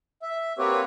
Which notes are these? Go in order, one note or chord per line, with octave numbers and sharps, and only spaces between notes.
E5
A#3 C4 F#4 G4 B4 C#5